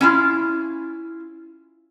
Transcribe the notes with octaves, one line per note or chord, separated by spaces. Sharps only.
C#4 E4 F4